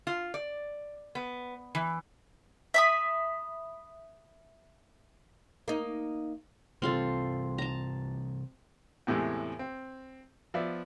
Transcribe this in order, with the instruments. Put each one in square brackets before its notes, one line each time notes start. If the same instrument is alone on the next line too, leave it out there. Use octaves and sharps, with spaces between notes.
[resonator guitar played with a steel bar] F4
D5
B3
E3
[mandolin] E5 B5 D#6
[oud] A#3 D#4
[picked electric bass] C3 E3 G3 [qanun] C4 F4 A4
[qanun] A5 A#5
[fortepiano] E2 A2 C3 E3 G#3
C4
F3 B3 D5 E5